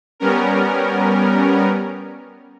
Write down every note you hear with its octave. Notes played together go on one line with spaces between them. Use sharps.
G3 B3 C#4 A#4